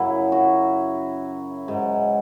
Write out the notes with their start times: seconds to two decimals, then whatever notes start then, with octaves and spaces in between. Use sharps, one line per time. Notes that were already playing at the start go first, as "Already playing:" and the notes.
Already playing: F#2 C#3 F#3 E4
0.32 F#4
1.68 G#2 F#3